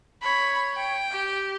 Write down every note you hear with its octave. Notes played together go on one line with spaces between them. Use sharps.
C#5 B5
G5
G4